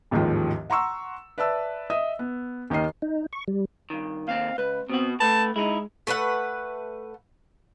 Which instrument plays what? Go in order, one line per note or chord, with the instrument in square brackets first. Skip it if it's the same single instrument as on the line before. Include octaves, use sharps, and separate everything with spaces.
[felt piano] A1 D#2 G#2 D#3 F3
F#5 A#5 C6 C#6 E6
B4 D5 E5 A5 E6
D#5 E5 D#6
B3
D#2 D#3 A#4 D#5 C7
[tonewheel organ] D#4
C#6
G3
[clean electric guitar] G2 D#3
[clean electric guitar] D#2 C4 [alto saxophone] F5
[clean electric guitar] C#2 [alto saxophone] B4
[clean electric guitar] B2 F#4 [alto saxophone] C4
[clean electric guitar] A3 B4 [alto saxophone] A5
[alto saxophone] G#3 [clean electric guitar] D#4 E4
[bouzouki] A3 B4 F5 F#5